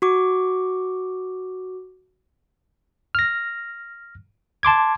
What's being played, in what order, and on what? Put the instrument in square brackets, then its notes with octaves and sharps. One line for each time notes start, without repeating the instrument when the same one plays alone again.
[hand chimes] F#4 C#6 D6
[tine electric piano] F6 A#6
A5 C6 D6 G#6